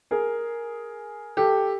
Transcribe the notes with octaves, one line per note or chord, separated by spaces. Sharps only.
G#4 A#4
G4 A4